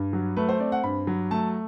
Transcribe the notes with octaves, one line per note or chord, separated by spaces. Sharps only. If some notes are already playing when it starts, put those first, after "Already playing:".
Already playing: G2
F#3
A3 B4
C5
C4 D5
F#5
G2 B5
F#3
A3 A5